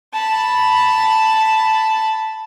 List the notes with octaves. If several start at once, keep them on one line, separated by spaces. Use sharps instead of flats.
A5 B5